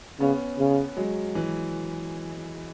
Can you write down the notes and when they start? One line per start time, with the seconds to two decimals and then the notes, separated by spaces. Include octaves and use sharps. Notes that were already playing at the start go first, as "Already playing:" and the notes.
0.20 C#3 B3 C#4
0.59 C#3
0.97 F#3 G#3
1.35 E3 F#3